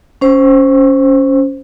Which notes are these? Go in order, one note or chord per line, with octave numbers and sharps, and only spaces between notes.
C#4 C5